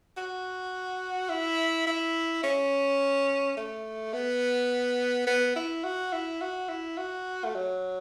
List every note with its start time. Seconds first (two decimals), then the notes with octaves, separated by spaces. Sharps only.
0.17 F#4
1.29 E4
1.87 E4
2.44 C#4
3.57 A3
4.13 B3
5.27 B3
5.56 E4
5.84 F#4
6.13 E4
6.41 F#4
6.69 E4
6.97 F#4
7.45 A3
7.55 F#3